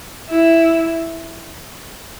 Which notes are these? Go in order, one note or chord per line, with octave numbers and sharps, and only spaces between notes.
E4